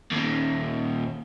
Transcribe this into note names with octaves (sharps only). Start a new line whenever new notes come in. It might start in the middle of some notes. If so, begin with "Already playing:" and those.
D#2 A#2